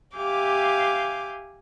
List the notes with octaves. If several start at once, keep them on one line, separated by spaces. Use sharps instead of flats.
G4 E5 F5 G#5 D6 G6